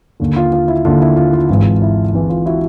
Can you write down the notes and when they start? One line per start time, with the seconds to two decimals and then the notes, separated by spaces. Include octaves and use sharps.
0.20 D#2 D3
0.36 F4
0.52 F4
0.68 E4
0.85 D#2 D3 F4
1.01 E4
1.16 F4
1.33 F4
1.49 G#1 G#2 E3 F4
1.82 E4
2.14 G#1 G#2 E3 E4
2.29 F4
2.46 E4 F#4